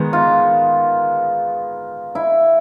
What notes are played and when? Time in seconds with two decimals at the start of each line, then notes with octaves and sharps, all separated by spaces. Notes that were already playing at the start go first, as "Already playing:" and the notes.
Already playing: D#3 G#3 B3
0.13 F4
2.15 E4